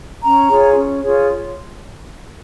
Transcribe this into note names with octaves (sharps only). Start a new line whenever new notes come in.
C#4 A#5
F4 G#4 C#5
C#4
F4 G#4 C#5